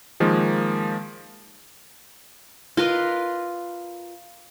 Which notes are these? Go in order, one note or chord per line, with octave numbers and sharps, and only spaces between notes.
D#3 F3 G#3 A#3
F4 A#4 B4 D#5